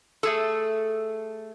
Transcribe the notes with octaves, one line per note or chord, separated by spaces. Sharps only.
A3 G#4 A4